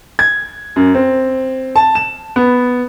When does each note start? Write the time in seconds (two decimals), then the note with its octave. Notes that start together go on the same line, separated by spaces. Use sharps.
0.19 G#6
0.76 F#2
0.95 C4
1.76 A5
1.95 E7
2.36 B3